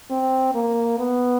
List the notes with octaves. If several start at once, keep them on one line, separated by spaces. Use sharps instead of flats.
C4
A#3
B3